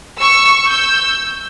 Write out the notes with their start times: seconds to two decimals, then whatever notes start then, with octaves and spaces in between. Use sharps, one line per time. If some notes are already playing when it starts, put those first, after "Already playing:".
0.20 C#6 E6
0.71 E6 G6